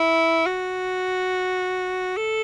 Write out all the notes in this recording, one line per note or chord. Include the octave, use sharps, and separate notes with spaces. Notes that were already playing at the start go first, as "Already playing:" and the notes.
Already playing: E4
F#4
A4